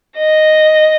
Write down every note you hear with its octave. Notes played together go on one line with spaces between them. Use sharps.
D#5